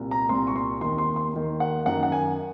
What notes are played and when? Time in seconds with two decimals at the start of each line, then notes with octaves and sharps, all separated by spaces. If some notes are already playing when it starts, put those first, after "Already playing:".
Already playing: C2 A#2
0.11 A#5
0.29 C2 A#2 C6
0.47 C#6
0.56 C6
0.81 D#2 D#3 C6
0.98 C6
1.16 C6
1.34 D#2 D#3
1.60 F#5
1.86 F#2 D#3 F#5
2.03 F#5
2.12 G#5